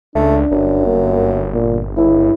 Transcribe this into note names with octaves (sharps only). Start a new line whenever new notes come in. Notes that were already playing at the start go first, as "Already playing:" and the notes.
C#2 A3 D4
G1 F#2
A#3
A#2
C#2 E4